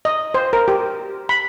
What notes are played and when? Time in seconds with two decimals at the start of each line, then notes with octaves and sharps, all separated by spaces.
0.05 D#5
0.34 C5
0.53 A#4
0.68 G4
1.29 B5